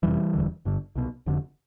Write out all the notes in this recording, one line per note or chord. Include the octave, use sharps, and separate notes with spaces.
F1 F2 C3 E3 G3
E1 D2 D3
G1 G2 D3
C2 B2
F1 F2 D3